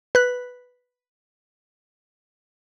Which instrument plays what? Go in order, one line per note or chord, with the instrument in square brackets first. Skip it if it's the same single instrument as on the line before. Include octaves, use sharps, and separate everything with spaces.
[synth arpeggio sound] B4 F#6